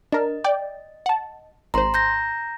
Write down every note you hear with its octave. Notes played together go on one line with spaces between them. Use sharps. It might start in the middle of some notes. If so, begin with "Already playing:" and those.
D4 A#4 D#5
D5 G5
F#5 A5
G#1 C5 A#5 C6
A#5 G6 A#6